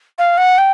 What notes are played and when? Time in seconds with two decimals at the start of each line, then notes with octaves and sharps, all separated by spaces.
0.19 F5
0.38 F#5
0.58 G5